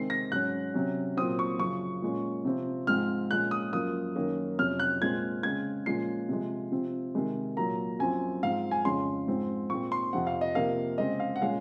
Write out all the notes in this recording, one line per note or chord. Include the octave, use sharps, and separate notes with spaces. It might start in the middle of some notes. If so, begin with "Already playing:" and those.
Already playing: C3 D#3 G#3 C4 C7
A#6
G#2 F#3 C#4 F#6
C3 F#3 C#4
A#2 F#3 C4 D#6
C#6
F#2 C#3 F3 C#6
A#2 G#3 C#4
C3 F3 C4
G#2 F3 G#3 C4 F6
A#2 F3 G#3 C#4 F#6
D#6
F#2 F3 A#3 D#6
F#2 D#3 A#3 C#4
F2 C3 F#3 C#4 F6
F#6
A#2 G#3 C4 G#6
C#3 G#3 C4 G#6
A#2 F3 G#3 C#4 C7
C3 F3 G#3
C3 F3 C4
C3 D#3 G#3
A#2 F#3 A#3 A#5
F#2 F3 C4 G#5
G#2 F3 C4 F5
G#5
F2 C#3 G#3 C#4 C6
G#2 F3 G#3 C4
A#2 G#3 C4 C#6
C6
F2 C3 F3 C4 F#5
F5
D#5
C3 F3 A#3 F5
C#3 G#3 C4 D#5
F5
F#5
A#2 G#3 C#4 F5